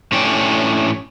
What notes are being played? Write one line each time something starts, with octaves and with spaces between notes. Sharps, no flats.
A2 C#4 D4 G5